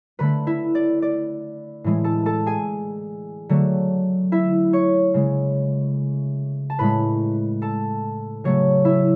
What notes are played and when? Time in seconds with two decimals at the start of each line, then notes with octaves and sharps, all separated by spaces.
0.19 D3 A3 B4 B5
0.47 E4 E5
0.75 D5
1.02 D5
1.84 A2 E3 G#3
2.04 A4 A5
2.26 A4 A5
2.46 G#4 G#5
3.49 D3 F#3 A3
4.32 E4 E5
4.73 C#5 C#6
5.14 C#3 G#3
6.70 A5
6.79 A2 G#3 B4 B5
7.62 A4 A5
8.44 C#3 F#3 A3 C#5
8.85 E4 E5